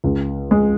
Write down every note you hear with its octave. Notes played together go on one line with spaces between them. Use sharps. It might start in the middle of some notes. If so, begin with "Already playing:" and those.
C#2
G#3